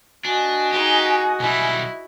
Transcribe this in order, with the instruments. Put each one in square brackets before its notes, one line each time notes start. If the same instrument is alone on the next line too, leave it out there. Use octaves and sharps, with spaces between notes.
[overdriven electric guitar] D4 [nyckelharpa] F#4 D#5 [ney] G#5
[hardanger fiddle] D#4 G#4 [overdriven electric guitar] G4
[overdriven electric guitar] B1 G3 [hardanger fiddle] E4